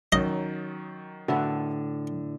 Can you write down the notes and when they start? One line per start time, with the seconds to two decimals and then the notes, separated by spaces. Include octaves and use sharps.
0.12 D#3 F#3 C#4 D#4 D#5
1.28 A2 D3 F#4 B4 E5